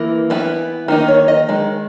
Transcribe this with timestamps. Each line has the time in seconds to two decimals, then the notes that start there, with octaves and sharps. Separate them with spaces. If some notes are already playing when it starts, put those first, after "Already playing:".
Already playing: E3 A#3 E4
0.30 E3 B3 E4
0.88 D#3 A#3 D#4
1.08 C#5
1.28 D#5
1.49 D#3 G#3